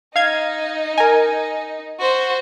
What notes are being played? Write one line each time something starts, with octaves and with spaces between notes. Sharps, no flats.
D#4 F5 G#6
A#4 G#5
F#4 C5